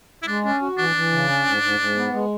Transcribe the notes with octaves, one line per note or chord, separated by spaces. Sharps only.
E4
G#3 D4
C#4 D4
F#4
E3 D4
E3
C#3
C#4
G#2
G#2
G#2
B3
G#3